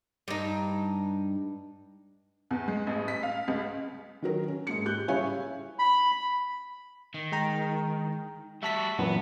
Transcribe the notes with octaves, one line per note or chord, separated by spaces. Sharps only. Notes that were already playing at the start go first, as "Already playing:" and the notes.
G2 D#4
E2
G#3
A1
B6
F5
C#2
D#3 F#3 A#4
C#4
G#2 A#3 C#7
G4 F#6 G6
C#3 G3 E4 C#5 F5 G#5
B5
D#3
G#3 G5 A#5
G3 F#4 E5 A5 B6
F#2 A#2 E3 B3